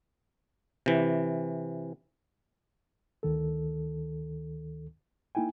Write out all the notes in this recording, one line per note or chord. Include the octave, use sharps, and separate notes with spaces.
C3 E3
D2 D#3 A4
A#3 D#4 E4 G5 G#5